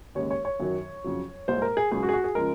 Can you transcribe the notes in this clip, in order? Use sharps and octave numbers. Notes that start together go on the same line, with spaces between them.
D#2 C#3 G#3 C#5
C#5
C#5
F#2 D#3 F#3
F2 C#3 F#3
C2 A#2 G#3 C5
A#4
G#4
C#2 C#3 F#3 G#4
F#4
G#4
F#4
G#4
C#3 F3 G#3 A#4